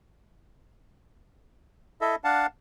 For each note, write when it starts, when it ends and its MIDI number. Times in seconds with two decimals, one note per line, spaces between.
2.01 2.16 64
2.01 2.16 69
2.01 2.16 75
2.01 2.16 76
2.24 2.46 62
2.24 2.46 77
2.24 2.46 78
2.24 2.46 81